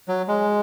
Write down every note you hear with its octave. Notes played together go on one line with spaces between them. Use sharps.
F#3
G#3